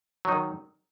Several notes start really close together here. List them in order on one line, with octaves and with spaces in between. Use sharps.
F#3 D#4 D#3